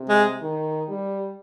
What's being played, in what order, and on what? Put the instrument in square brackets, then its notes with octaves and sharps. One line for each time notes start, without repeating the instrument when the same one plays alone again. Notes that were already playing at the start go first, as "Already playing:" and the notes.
Already playing: [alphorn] C3
[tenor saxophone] G#3
[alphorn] D#3
G3